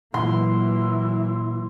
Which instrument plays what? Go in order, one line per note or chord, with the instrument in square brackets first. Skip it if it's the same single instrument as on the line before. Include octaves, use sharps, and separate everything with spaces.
[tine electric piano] A#2 [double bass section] E3 F#3 A#3 [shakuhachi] E4 [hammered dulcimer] C6